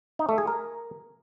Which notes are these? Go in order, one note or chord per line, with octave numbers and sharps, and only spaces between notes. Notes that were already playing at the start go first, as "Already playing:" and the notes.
D#4
A3
G#4
A#4